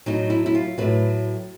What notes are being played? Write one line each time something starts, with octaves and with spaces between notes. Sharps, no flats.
A2 F#3 D#4
E4
E4
F4
A2 F#3 B4